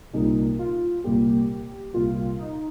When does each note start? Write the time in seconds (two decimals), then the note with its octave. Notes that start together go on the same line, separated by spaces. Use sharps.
0.14 C2 A#2 A#3 D#4 F4
0.59 F4
1.04 C2 A#2 G3 A#3 G4
1.94 C2 A#2 G3 A#3 F4
2.39 D#4